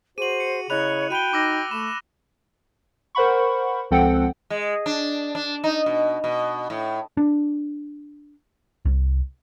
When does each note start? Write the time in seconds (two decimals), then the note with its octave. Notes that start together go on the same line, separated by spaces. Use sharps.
0.18 F#4 G#4 C5 D#7 F#7
0.40 C#7
0.70 C#3 E4 C#5 D#5 B5 F#6 F7
1.10 F#4 G5 B5 D#7 G7
1.33 D#4 D6 E6 A#6
1.71 A3 B5 E7
3.15 A#4 C5 F#5 B5 C#6
3.91 C#2 F3 C4 A4 F#5 G5
4.50 G#3
4.86 D4
5.35 D4
5.64 D#4
5.86 B2
6.24 B2
6.70 A2
7.17 D4
8.85 C2